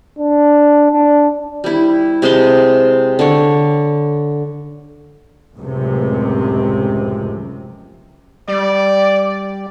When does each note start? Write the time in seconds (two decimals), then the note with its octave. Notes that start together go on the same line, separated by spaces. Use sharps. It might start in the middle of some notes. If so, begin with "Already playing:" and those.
0.18 D4
0.92 D4
1.64 G3 E4
2.22 C3 G#3 A5 C6
3.19 D3 C#5
5.57 F1 C#2 F#2 A2 C3
8.48 G3 D5